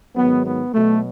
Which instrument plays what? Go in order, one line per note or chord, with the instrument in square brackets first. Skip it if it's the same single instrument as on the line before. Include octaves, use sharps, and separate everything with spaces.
[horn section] G#2 D#3 F#3 B3
B3
B2 F#3 A3